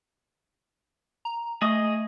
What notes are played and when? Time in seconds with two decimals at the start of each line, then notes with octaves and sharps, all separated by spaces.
1.25 A#5
1.62 A3 G#4 D#5 D#6